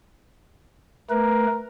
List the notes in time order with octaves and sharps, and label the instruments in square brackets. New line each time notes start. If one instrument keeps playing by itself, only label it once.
[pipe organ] A3 B4 [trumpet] A#4